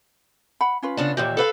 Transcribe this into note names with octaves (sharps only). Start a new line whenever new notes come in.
F#5 B5
C#4 F4 B4
C#3 B3 D4
D#2 A#2 E3 G4
A4 B4 F5